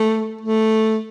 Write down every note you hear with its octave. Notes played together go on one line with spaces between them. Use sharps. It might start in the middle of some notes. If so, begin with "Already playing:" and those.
Already playing: A3
A3